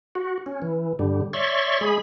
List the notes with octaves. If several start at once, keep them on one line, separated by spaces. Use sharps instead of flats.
F#4
C#4
E3
G2 D3 G3
C#5 D5 E5 C6 C#6
G#3 G#4 B5